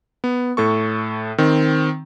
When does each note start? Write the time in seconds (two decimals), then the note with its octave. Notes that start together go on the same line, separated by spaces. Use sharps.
0.24 B3
0.57 A2 A4 C#6
1.38 D#3 C4